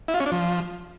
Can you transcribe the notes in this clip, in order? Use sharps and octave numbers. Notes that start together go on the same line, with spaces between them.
E4
F4
C#4
D4
F3